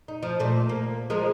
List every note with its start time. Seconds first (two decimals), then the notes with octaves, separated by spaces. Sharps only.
0.08 D#4
0.23 F3
0.40 A#2 A3
0.69 A#3
1.10 F3 G#3 A#4